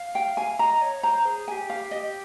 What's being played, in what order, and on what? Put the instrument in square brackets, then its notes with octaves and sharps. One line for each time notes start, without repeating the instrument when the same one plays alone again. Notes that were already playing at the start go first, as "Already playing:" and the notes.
Already playing: [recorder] F5
[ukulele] G5
G#5
[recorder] D#5 [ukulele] A#5
[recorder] C#5
[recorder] C5 [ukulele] A#5
[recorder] G#4
[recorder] G#4 [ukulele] G#5
[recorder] G4
[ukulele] F5
D#5